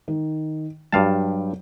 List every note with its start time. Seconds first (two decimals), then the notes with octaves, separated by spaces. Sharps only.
0.08 D#3
0.92 G2 F#3 F5 G5 A5